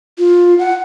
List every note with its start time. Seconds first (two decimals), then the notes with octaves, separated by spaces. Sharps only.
0.19 F4
0.59 F#5